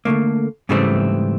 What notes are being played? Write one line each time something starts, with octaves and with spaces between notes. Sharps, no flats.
D3 F3 A3 A#3
G#2 C#3 E3 G3 A3 C4